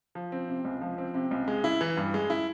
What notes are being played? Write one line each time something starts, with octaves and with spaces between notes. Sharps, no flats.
F3
C4
C3
C#2
F3
C4
C3
C#2
G#3
E4
E3
G2
G#3
E4